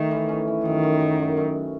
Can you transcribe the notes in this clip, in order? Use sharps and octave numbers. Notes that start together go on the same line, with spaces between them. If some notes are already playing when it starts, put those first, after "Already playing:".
Already playing: D#3 A3
E3
C#4
E3
F#2 D#3
F#2
F#2
F#2
F#2